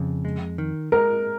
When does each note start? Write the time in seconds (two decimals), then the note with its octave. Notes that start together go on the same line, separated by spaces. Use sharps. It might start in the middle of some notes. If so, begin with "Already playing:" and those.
Already playing: F2 C#3
0.25 G#3
0.58 D#3
0.92 G#3 A#4